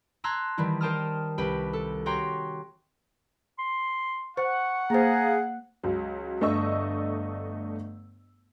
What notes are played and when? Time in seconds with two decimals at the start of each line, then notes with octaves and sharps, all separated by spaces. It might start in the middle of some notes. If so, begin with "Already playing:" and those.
0.24 A5 A#5 C6 E6 F#6 G#6
0.58 D#3 E3 G3 E4
0.81 A#4 C5 G5 A5 D#6 F6
1.38 C2 G4 B4
1.73 A4
2.06 F#4 G4 C#5 G5 A#5 C6
3.58 C6
4.37 C5 F#5 C#6
4.90 A#3 G#4 C5 F5 A#5
5.84 C#2 F#3
6.41 G1 A3 D4 D#5 C#6 E6